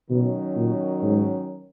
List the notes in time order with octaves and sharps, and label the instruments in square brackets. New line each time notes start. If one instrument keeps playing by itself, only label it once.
[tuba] B2 [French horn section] D#3 F#3 C#4
[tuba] A#2
G#2